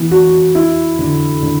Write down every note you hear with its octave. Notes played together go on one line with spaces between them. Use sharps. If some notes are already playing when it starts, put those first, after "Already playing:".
Already playing: E3 B3
F#4
E4
D3
D3